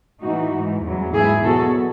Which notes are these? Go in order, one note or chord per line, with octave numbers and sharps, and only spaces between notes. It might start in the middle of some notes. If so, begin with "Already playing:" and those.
A2 E3 D#4 F#4
G#2 E3
E2 C#3 F#3
G#2 E3 E4 G#4
E2 B2 F#3 F#4 A4